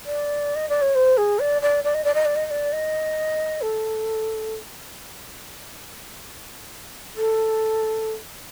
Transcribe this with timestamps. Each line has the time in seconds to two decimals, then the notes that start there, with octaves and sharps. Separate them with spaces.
0.06 D5
0.56 D#5
0.69 D5
0.82 C#5
0.95 C5
1.17 G#4
1.39 D5
1.62 D5
1.84 D5
1.95 D#5
2.04 D5
2.14 D#5
2.25 D5
2.36 D#5
2.46 D#5
2.50 D5
2.73 D#5
3.62 A4
7.16 A4